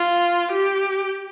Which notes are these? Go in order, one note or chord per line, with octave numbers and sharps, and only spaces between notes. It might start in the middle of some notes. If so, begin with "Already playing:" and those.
Already playing: F4
G4